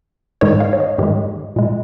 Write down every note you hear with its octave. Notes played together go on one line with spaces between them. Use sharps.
G#2 D#3 G#3 C#5
F5
C#5
D#5
G#2 D#3 G#3 G4
A#2 G#3